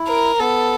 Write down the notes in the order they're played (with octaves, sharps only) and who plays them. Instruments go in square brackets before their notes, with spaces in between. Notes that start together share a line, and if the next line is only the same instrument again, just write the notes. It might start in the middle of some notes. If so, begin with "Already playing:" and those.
Already playing: [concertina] E4
[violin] A#4
[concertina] B3 [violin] A4